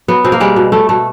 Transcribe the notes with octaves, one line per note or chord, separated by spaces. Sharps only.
F#3 B3
B2 C4
A#3
G3 G#3
B2
G3 A3
B2 A3